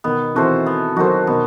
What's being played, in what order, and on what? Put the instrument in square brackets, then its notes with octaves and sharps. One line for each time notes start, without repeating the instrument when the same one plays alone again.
[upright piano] B2 D#3 [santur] B3
[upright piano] C3 E3 [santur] F#4 A4 C5
[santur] B3
[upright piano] D#3 F#3 [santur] F#4 A4 C5
[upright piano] B2 D#3 [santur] B3